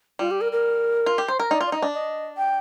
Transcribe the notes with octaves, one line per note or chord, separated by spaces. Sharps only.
G3 F4
G4
A#4
A#4
F4
G4
C5
A#4
D#4 D5
F4
D5
D#4 D#5
D4
D#5
G5